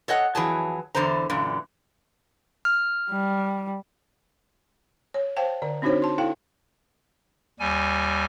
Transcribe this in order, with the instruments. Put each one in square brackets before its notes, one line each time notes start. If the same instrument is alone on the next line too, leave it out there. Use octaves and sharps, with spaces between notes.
[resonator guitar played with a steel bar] A4 C#5 D#5 F#5
F2 E3 F#3 G#4 A5
E2 D3 E3 C5 A#5
F#2 A#2 D3 E3
[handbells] F6
[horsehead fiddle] G3
[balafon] C#5
C5 F5 G5 A5
D3 D5
C4 D4 D#4 F#4 C5 C#5
A5 C6
E4 A4 F5 G5
[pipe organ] D#2 G3 G#5